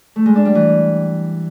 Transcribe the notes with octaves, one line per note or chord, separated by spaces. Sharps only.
A3
G#3
D4
G3
E3